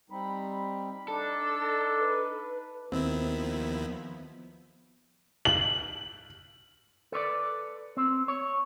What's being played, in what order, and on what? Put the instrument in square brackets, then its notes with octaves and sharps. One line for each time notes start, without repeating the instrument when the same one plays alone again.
[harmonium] G3 C4 D#4 [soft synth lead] B5
[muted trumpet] D4 [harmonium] D#4 [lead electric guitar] A4
[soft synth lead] E6
B4
[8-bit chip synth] D#2 D#3 E4 [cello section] F3 B3 [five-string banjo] C4
[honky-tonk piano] F#7
[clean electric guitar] A4 B4 C#5 D5
C4
C#5